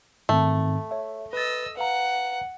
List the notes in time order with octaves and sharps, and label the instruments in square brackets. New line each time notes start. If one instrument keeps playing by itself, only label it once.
[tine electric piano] G#2 D#3 C4 [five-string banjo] A3
[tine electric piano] C#5 E5
[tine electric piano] B4 A6 [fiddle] D#5 E6
[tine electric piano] B4 F5 A#5 [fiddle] F#5